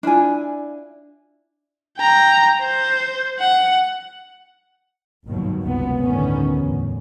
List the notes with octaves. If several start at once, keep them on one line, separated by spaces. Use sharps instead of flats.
D4 E4 F4 G#5
G5 A#5
C5
F#5
G1 D#2 G#2 B2 D#3 F#3
F#1 C#2 C3 B3
G1 D2 A2 D#3 B3 C#4
G1 E2 A2